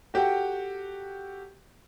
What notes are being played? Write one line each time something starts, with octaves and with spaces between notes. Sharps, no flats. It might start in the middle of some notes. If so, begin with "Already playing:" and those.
F#4 G4 A4 F#5 G5